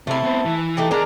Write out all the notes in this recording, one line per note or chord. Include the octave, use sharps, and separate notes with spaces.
C3 A3 E4
B3 C4
E3
A3 D#4 G4
D#2 G#3 D4 A#4 A#5